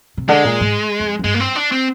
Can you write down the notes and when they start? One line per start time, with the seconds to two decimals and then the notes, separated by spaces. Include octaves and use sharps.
0.17 C3
0.29 D3 G#3
0.44 A#2
0.61 G#2
1.00 F2
1.19 F2
1.24 G2 G#3
1.34 A#3
1.40 C4
1.56 D4
1.72 C4